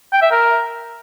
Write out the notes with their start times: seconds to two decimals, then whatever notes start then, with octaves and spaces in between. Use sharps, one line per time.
0.12 G5
0.22 E5
0.32 A#4